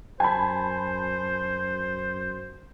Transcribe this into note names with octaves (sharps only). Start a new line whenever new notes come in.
F#2 C5 G#5 A5 B5